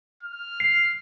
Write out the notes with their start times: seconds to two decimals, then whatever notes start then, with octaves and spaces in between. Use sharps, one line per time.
0.23 F6
0.60 C7